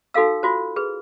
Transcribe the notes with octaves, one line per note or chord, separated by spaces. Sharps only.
D#4 F#4 A4 F5 E6
F4 F#4 C5
G#4 B4